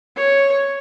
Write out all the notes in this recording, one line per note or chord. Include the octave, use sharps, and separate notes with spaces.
C#5